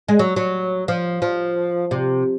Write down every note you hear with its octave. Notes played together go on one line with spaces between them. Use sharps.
G#3
F#3
F#3
F3
F3
C3